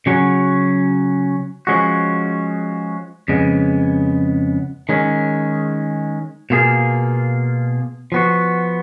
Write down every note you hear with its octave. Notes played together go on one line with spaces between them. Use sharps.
C#3 F#3 C#4 F#4
F3 G#3 C#4 F#4
F2 C#3 G#3 B3
D#3 G#3 C#4
B2 A#3 F4 G#4
F3 B3 F#4